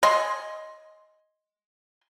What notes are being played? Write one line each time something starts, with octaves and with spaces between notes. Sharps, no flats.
D#5 G#5 C6